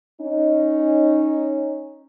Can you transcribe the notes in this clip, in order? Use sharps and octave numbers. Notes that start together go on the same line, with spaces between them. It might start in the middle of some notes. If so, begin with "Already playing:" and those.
C#4 D#4